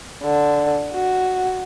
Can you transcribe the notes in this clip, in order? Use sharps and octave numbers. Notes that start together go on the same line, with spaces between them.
D3
F#4